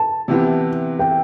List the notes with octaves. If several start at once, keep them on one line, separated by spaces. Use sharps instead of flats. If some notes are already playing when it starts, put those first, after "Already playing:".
Already playing: A5
C3 E3 B3 E4 G4
G5